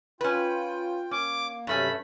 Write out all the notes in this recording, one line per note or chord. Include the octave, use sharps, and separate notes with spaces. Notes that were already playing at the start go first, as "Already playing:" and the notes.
C#4 F4 B4 G5
A#3 C#4 D6
G2 C3 F#3 A3 C#4 B5